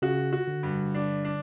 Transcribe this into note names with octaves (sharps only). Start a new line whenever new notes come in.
C#3 F#4
F#4
D3
G2
D4
D4